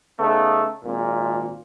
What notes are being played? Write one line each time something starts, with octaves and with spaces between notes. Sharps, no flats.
C#3 A3 B3 D#4
G#1 A#2